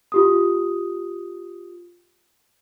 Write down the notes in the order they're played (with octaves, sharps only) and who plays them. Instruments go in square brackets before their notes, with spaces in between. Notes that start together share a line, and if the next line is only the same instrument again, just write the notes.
[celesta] F4 G4 D#6